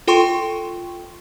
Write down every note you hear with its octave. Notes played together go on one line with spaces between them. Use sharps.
F4 A4 G5 C6 C#6